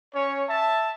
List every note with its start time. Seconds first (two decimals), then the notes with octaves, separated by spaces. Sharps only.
0.15 C#4 C#5
0.49 E5 A5